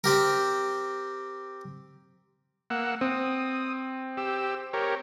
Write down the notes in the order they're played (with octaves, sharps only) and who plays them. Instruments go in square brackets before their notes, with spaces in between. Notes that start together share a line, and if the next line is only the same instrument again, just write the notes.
[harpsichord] C4 G4 A#4
[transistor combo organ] A#3 F#5 E6
[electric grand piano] C4 [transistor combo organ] D#6
[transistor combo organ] G4 E6
G4 A#4 C#5